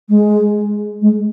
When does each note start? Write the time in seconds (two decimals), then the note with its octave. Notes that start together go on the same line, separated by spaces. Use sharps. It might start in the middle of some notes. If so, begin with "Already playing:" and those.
0.09 G#3
1.01 G#3